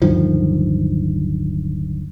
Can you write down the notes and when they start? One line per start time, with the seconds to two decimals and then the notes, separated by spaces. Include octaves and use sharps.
0.02 D1 G2 D#3 F3